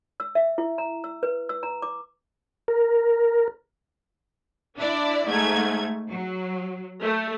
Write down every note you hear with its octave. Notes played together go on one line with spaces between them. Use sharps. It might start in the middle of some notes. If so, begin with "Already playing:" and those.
E6
E5
E4
A#5
E6
B4
E6
A#5
D6
A#4
D4 E4 D5
G#2 A3 G#6
F#3
A3